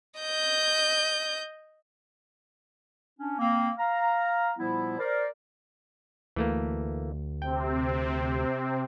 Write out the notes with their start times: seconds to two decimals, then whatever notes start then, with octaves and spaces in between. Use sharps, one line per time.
0.20 D#5 G6
3.19 C#4 D4
3.39 A#3 C4
3.77 F5 A#5
4.57 A#2 F3 G3 B3 E4
4.99 A#4 C5 D5
6.36 D2 E3 A3 A#3
7.42 C3 C4 G5